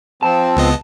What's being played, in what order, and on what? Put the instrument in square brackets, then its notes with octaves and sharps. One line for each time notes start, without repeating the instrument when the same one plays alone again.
[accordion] F3 C4 [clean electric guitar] A5
[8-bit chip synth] C#2 B3 D#5